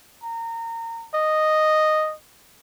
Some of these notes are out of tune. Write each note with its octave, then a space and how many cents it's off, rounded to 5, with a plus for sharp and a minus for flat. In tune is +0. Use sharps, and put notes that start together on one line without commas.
A#5 -25
D#5 -5